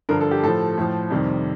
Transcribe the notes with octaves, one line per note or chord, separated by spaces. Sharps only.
G2 D3 F3 A#4
A4
G4
A2 F3 A4
A2 F3
F2 C3 D#3 G3